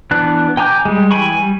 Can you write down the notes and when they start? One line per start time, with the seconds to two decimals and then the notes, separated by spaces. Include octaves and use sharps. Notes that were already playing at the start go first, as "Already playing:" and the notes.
0.11 E3 B3 D4 F#6
0.57 G5 G#5 A#5 D6 G6
0.85 G3 G#3
1.11 E3 G5 G#5 B5 C#6
1.37 G3